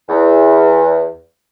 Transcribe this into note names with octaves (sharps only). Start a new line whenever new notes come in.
E2